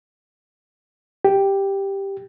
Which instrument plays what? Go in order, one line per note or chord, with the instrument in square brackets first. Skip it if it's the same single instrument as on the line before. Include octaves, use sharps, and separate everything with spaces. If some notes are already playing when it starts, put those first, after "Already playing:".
[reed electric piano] G4